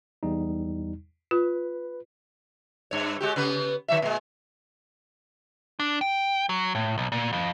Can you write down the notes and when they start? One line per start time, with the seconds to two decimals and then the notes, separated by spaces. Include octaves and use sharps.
0.23 E2 G3 D#4
1.31 F4 B4
2.91 G2 C#5
3.21 G#3 F#4 G4
3.36 C#3 B3 B4
3.88 D#3 F#3 E5
4.02 A#2 G#3
5.80 D4
6.01 G5
6.49 F#3
6.75 A2
6.98 B1
7.12 A#2
7.33 F2